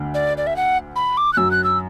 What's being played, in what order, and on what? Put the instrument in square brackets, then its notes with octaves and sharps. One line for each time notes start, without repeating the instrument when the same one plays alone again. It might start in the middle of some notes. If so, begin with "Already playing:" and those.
Already playing: [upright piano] D2 D3
[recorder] D5
D5
E5
F#5
B5
D6
F#6
[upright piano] F#2 F#3 [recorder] E6
[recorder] F#6
E6